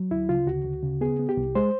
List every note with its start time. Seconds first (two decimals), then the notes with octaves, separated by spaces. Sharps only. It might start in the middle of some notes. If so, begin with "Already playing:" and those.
Already playing: F#3
0.11 D2 E4
0.29 C#3 F4
0.47 D2 F#4
0.65 D2
0.83 C#3
1.01 B3 G#4
1.19 B3
1.29 G4
1.37 C2
1.55 G#3 C5